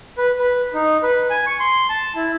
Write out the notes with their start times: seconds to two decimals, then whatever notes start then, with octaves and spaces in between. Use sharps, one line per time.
0.18 B4
0.38 B4
0.74 D#4
1.03 B4
1.30 G#5
1.47 C#6
1.60 C6
1.89 A5
2.16 E4